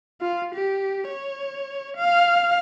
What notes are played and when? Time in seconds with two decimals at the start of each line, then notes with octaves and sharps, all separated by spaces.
0.21 F4
0.54 G4
1.08 C#5
1.97 F5